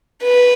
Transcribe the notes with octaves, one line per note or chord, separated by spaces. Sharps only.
B4